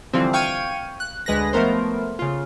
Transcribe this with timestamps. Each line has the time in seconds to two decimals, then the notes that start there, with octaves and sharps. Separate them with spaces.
0.13 D3 E3 F3 G3 C4
0.33 F5 G5 C#6 F6 G#6 D#7
1.00 F#6
1.26 D2 G#3 B4 F#6 A#6
1.53 F3 A3 B3 A#4 C5
2.19 C#3 F4